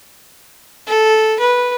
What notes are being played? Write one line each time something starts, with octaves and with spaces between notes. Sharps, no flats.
A4
B4